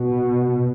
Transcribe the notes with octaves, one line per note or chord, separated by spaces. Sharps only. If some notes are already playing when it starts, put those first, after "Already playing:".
Already playing: B2